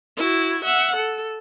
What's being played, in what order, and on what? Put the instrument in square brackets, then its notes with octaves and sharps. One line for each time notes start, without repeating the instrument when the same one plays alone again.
[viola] E4 F#4
E5 F#5
A4